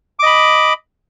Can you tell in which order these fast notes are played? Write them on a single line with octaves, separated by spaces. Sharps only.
D6 D#5 B5